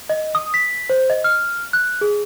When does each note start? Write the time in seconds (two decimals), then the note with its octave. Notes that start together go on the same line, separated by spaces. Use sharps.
0.10 D#5
0.35 D#6
0.54 B6
0.90 C5
1.10 D#5
1.24 F6
1.73 F#6
2.01 G#4